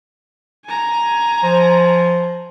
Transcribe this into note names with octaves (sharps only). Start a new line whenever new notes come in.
G#5 A#5
F3